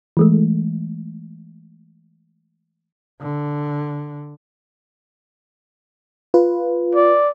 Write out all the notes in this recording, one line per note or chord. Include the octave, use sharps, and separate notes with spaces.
E3 G#3 A3
D3
F4 B4
D5